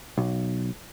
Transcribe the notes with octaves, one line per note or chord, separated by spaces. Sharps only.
B1